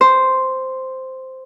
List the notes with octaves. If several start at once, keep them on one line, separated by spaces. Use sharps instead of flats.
C5